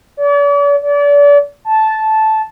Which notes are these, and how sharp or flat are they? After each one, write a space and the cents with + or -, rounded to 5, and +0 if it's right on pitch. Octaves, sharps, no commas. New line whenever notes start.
D5 -45
D5 -35
A5 -10